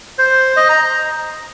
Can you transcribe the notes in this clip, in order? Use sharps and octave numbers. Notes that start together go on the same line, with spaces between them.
C5
D#5
A#5